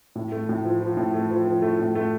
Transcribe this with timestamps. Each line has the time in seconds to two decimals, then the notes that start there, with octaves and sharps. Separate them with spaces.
0.15 A2
0.32 A3
0.49 A2
0.65 F3
0.81 F3
0.97 A2
1.14 A3
1.30 F3
1.46 F3
1.62 A3
1.79 A2
1.95 A3